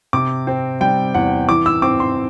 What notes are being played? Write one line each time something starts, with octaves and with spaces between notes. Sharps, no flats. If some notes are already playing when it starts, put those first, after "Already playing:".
C3 D6
C4
G3 G5
E2 F#5
E3 D6
E6
C4 D6
C6